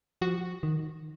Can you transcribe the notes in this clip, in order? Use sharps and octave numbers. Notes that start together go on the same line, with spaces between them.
F3 F#4
D#3